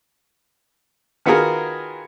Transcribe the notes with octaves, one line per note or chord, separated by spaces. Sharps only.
D#3 B3 F4 F#4 G#4 A#4